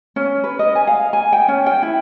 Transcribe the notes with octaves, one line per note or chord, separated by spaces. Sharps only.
C#4
B4
D#5
G#5
F5
G#5
G5
C#4
G5
E4